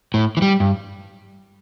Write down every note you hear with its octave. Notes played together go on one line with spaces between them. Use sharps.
A2
E3
G3
G2